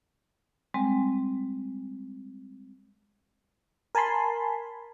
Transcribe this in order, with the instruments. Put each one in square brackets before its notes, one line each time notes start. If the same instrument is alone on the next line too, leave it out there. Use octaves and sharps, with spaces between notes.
[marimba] G3 G#3 C4
[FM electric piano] A#4 G#5 A5 B5 C6